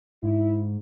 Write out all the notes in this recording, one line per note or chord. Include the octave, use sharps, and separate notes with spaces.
G#2 E4